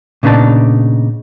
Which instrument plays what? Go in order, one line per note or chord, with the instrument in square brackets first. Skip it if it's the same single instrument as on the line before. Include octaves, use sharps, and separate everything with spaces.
[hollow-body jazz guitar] A#2 C#3 B3 D4 D#4 A5